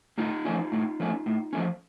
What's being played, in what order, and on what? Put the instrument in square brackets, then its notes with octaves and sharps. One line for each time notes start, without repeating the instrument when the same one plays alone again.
[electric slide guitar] A2 D#4 F4
F3 A3 C#4
A2
F3 A3 C#4
A2
F3 A3 C#4